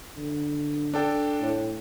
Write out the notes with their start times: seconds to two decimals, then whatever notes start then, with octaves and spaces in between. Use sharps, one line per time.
0.17 D3
0.94 D4 A4 G5
1.41 A2